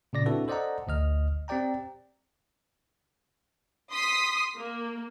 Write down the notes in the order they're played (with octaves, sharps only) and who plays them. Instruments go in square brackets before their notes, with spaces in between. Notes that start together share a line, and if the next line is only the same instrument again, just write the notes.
[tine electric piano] A#2 C#3 D5 A#6
C4 D4 E4 F#4 A4 B4
A4 C5 D5 D#5 F#5 A#5
G1 D2 D#5 F6
C4 G4 D5 G5 A#5
[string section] C6 D#6 B6
A#3